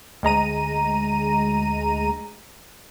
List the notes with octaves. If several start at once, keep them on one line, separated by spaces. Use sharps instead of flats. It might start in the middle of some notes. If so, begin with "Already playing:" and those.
D2 G#3 A#5 D#7